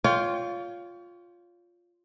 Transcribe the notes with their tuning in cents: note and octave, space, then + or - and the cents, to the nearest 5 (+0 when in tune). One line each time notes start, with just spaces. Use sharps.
F4 +5 C#5 +35 G5 +0